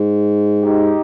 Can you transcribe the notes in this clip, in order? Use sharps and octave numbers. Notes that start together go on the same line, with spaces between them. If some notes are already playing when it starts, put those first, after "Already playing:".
Already playing: G#2
D#4 G4